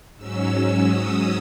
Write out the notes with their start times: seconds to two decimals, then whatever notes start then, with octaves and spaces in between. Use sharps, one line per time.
0.17 G#2 F#3 C#4 E6
0.84 D#6